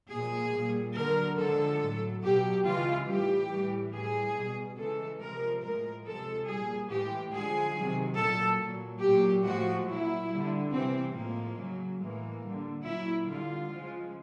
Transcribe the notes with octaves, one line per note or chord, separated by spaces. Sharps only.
A#2 F3 G#3 G#4
A#2 G3
D3 F#3 A#4
D3 F3 G#3 A4
A2 F#3
B2 F#3 G4
C#3 E3 G#3 F4
A2 E3 G3 G4
A2 E3 G3
A2 E3 G3 G#4
B2 G3
C#3 E3 G#3 A4
C3 F3 G#3 A#4
A2 F3 G#3 A#4
C3 F3 G#3 A4
A#2 G3 G#4
A2 E3 G#3 G4
D3 F3 G#3 G#4
C3 D#3 F#3
A#2 F#3 A4
A#2 F#3
A#2 F#3 G4
A2 F3 G#3 F#4
A#2 F#3 E4
D3 G3
C3 E3 G3 C4
A2 F3 G#3 A#3
C#3 F#3
A2 E3 G#3 A#3
D3 G3
A#2 F#3 E4
D3 G3 F4
C#3 F3 G#3